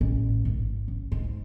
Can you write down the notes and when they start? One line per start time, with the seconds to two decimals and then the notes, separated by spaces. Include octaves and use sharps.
0.01 A1
0.45 G#1
0.88 A1
1.12 G#2